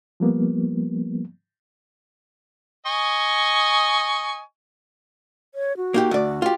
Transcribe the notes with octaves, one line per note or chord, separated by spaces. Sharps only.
F3 G3 A#3 B3
D#5 G#5 C#6
C#5
F#4
A#3 D#4 G4
D2 D5
F4 G4